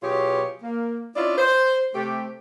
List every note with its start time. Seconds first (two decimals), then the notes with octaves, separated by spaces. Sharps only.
0.03 B2 F#3 F4 G4 G#4 C#5
0.63 A#3
1.16 C#4 D4 E4 F4 D5 D#5
1.38 C5
1.94 C3 A3 G4